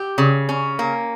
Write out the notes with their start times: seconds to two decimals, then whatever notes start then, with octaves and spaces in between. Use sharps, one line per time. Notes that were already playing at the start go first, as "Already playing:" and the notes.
Already playing: G4
0.18 C#3
0.49 C#4
0.79 A#3